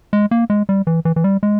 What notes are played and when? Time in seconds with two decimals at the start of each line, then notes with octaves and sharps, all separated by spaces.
0.13 G#3
0.31 A#3
0.50 G#3
0.69 G3
0.87 E3
1.05 E3
1.16 E3
1.24 G3
1.43 G#3